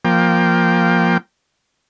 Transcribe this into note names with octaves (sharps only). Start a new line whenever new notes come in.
F3 A#3 G5